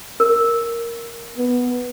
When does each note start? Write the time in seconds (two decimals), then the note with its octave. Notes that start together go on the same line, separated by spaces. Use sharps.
0.20 A#4
1.38 B3